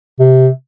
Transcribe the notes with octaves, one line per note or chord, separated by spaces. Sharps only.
C3